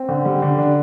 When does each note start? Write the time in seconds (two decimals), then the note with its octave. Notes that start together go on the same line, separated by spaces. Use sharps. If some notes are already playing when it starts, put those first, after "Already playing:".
Already playing: C4
0.09 D3
0.25 G3
0.42 D3
0.58 D4